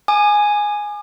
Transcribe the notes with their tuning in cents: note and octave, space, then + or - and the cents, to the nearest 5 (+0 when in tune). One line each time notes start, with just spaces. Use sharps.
G#5 +0 D6 +45